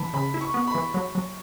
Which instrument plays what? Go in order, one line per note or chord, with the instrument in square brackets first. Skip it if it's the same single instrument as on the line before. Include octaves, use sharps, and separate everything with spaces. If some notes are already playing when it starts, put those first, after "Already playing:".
Already playing: [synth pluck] E3 [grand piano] A5 B5
[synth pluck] C#3 [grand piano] B5
[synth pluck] E4
[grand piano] C#6
[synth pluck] B3
[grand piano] B5
[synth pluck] E3
F#3
F#3